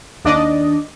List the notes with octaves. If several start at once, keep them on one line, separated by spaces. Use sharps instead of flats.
D#2 D4 D5 D#5